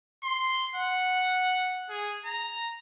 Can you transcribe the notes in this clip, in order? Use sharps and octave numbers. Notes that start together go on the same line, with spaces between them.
C6
F#5
G#4
A#5